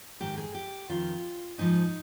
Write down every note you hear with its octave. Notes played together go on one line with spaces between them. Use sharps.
G#2 D#3 G4
G#4
G4
F2 D#3 F4
G#2 F3 D#4